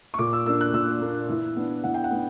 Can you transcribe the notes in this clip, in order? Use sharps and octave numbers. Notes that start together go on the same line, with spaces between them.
C#6
A#2 D6
E6
A#3 D4 E6
F#6
A#2 E6
A#3 D4
E3
B3 D4
E3 F#5
G5
F#5
B3 D4